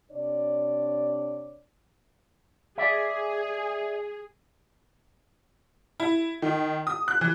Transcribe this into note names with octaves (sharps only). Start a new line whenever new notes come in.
C3 D4 C#5 D5
G#4 D5 E5
E4
D#3
D#6
F#6
E3